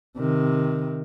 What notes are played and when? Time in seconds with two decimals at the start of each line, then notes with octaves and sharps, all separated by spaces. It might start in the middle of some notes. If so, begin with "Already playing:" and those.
0.18 C3 D#3